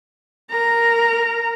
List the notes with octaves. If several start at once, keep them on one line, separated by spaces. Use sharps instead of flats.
A#4 A#5